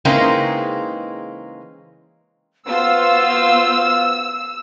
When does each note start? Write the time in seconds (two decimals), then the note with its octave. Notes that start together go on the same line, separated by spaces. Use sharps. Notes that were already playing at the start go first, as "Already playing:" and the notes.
0.05 C#3 E3 G#3 A#3 C4 D#4
2.68 B3 F4 F#4 C5 F5 E6